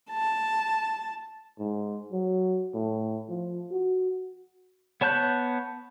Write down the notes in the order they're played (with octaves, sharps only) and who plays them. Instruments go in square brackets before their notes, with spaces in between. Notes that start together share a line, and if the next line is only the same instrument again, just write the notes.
[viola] A5
[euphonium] G#2
F#3
A2
F3
F#4
[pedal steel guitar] B3 C#5 A5 F#6 G6